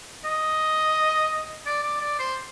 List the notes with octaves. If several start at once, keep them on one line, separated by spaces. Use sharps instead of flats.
D#5
D5
D5
D5
C5